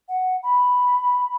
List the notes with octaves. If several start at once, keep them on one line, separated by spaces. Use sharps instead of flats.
F#5
B5